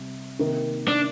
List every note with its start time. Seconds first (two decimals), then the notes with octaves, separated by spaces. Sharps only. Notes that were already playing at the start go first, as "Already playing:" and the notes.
Already playing: C3 G3 C4
0.39 C3 D#3 A#3
0.88 D4